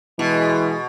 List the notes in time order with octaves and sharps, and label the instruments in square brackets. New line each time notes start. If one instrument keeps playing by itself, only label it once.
[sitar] B2 [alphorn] E3 [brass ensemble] G#3